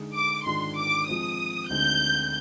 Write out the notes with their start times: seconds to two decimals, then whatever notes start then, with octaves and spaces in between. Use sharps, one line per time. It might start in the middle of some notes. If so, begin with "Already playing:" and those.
Already playing: D3 G#3 D#4 G#4
0.15 D6
0.46 G#2 D#3 G#3 D4 F4 C6
0.77 D6
1.07 F3 G#3 C4 D#6
1.69 D2 D3 G#3 C4 D#4 G6